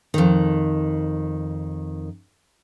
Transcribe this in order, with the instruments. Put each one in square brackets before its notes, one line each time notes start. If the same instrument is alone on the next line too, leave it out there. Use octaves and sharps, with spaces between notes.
[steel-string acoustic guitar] F2 D#3